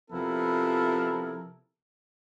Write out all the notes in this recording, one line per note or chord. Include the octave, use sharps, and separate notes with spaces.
C3 F3 B3 E4 A4 A#4